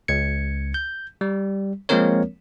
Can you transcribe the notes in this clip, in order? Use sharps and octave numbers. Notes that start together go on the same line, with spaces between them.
C#2 G#6 C#7
G6
G3
F3 G#3 A#3 C4 A#4 C#5